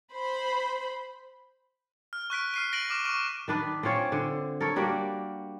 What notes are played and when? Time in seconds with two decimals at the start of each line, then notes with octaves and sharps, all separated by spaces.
0.13 C5 B5
2.13 F6
2.30 C#6 F#6 B6 D7
2.54 F6 C7 D#7
2.73 A#6 D7 D#7 F#7
2.89 C#6 D6 F6 E7
3.05 C#6 D6 F6 D7
3.48 D#3 D4 B4
3.83 C4 C#4 F4 C#5
4.12 D3
4.61 A4 A#4 C#5
4.76 G3 A#3 D4 F#4